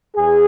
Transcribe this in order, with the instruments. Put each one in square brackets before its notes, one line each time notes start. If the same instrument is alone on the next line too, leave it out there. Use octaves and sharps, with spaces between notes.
[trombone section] E2 G#4